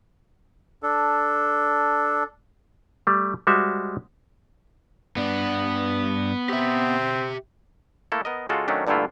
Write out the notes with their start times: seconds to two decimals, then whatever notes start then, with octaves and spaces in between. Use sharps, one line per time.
0.83 D4 A4
3.07 G3 A3
3.47 G3 G#3 F#4 C5 E5
5.16 G2 B3 D4
6.49 C4 G4 E5
8.12 A3 A#3 E4 A4
8.25 B3 A#4 D#5
8.49 C#3 G#3 F4 F#4 A4
8.68 D#3 F#3 A3 C#4 D4
8.87 G2 A#2 D3 A3 E4 F4